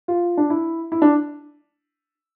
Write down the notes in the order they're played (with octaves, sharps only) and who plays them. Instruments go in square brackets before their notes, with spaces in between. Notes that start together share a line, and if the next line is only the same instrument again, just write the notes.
[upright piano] F4
D4
E4
E4
D4